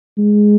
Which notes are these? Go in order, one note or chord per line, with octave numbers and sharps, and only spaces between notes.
G#3